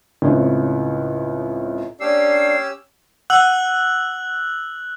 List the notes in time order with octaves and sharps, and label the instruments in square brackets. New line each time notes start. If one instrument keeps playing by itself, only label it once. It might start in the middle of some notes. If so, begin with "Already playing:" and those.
[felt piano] C#2 A2 C#3 C4
[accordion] A#3 D4 D5 [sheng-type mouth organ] C#4 G4 E6 [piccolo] C7
[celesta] F#5 [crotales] E6 F#6 F#7